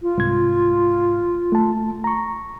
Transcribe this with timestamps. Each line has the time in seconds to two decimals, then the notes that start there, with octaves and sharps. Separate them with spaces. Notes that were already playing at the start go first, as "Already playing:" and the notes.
0.03 F4
0.18 C2 G#2 G#6
1.52 A3 A5
2.04 A#5 C#6